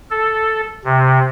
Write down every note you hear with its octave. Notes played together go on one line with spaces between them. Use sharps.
A4
C3